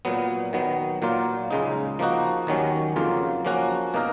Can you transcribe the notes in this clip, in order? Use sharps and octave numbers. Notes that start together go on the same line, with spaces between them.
A#2 F#3 B3
D#3 F#3 B3
A#2 F#3 A#3 F4
C#2 C#3 G#3 D#4
F3 A#3 D#4 F#4
D#2 D#3 F#3 C#4
F2 C#3 F#3 A#3 F4
F3 A#3 C#4 F#4
B2 A#3 D#4 A#4